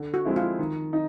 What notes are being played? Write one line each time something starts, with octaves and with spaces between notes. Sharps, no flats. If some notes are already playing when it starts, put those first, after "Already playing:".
Already playing: D3
F#4
F3 G#3 C4 E4
F4
D#3
D#4